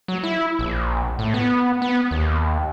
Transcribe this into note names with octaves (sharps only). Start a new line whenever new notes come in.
F#3
E4
A#1
A2
B3
B3
D#2